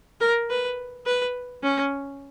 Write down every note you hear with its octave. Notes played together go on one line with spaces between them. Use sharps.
A#4
B4
B4
C#4